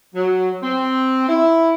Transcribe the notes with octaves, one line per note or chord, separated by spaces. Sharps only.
F#3
C4
E4